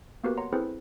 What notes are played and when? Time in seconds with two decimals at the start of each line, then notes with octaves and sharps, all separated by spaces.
0.24 A#3 B3 F#4 G4 A#4 B4
0.37 C#5 F#5 A#5 C6
0.53 C4 E4 G#4 A4 B4 C5